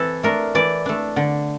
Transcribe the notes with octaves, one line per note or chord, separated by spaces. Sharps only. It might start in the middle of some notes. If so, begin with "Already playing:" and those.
Already playing: E3 C4 A4
A3 D4 A#4
E3 D5
A3 D4
D3